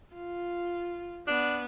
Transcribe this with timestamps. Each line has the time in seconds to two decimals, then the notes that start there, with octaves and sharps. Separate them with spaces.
0.14 F4
1.27 B3 D4